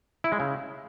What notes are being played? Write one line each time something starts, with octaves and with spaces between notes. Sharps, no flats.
E4
G#3
C#3